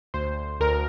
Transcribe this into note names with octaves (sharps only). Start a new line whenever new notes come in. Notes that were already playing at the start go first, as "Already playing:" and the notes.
D2 C5
D2 A#4